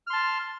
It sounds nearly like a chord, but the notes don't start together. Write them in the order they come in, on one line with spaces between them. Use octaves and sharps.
F6 C6 A5